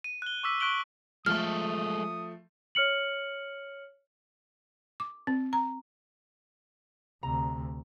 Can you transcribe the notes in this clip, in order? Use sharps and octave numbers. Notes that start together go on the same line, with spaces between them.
D#7
F#6 G7
C#6 D6 E6 B6
C#6 F#6 B6 D7 F#7 G7
F3 G#3 A3 A4 D#6 F6
C#5 F6 C#7 F#7
D6
C4
A#5
D2 C3 A#5